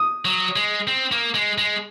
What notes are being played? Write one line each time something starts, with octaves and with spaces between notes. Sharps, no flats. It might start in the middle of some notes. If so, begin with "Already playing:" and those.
Already playing: D#6
F#3
G#3
C4
A#3
G#3
G#3